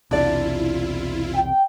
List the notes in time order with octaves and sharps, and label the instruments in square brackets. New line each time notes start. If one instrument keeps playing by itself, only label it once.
[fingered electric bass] B1 E2 C3 [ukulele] D4 D5 [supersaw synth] E4 F4
[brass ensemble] G5